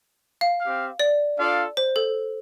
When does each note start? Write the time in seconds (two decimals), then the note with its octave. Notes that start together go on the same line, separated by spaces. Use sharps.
0.41 F5
0.60 C4 G4 F5
0.99 D5
1.38 D4 F4 A4 D5 F5
1.77 C5
1.96 A4